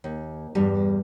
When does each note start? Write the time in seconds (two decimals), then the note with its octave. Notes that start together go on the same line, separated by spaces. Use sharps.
0.04 D#2
0.55 E2 G2 G3